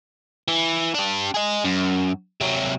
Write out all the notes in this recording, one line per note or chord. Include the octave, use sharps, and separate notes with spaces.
E3
D4 G4
G#4 D#5
F#2
C3 F#3